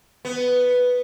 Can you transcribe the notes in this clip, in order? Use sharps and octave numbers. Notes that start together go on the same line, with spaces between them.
B3